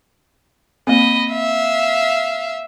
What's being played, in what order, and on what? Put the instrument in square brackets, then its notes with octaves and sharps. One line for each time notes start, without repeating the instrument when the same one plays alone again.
[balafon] A#3 C4 [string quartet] D#5 B5
[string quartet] E5 F5